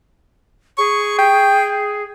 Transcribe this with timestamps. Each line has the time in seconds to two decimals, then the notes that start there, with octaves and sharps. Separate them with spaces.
0.78 G#4 C#6
1.18 G5